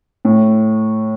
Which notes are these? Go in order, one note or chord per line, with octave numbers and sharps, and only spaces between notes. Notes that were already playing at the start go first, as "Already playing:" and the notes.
A2